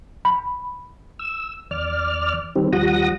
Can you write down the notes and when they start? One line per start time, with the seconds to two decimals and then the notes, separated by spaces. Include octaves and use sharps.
0.25 B5
1.19 E6
1.71 E2 D5 F6
2.56 D#3 G3 C4
2.72 D#2 F3 G3 F#5 D#6 A#6